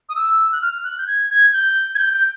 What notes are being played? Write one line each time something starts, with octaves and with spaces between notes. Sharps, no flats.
D#6
E6
F#6
F6
F#6
G6
G#6
G#6
G6
G#6
G6
G6